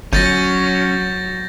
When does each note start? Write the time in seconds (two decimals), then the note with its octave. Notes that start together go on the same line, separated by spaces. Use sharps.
0.13 G1 F#3 C#4 G6 A6 A#6